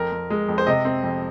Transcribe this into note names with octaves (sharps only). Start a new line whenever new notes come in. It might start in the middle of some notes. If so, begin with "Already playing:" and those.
Already playing: F2 A#4
F2
G#3
F2
C5
C3 D#5
C4
F2